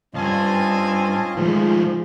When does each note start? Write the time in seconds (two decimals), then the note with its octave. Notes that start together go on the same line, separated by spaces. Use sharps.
0.14 D2 G2 C4 C#4 F4 D#5 G#5 A5
1.37 D#3 F3 G#3 A3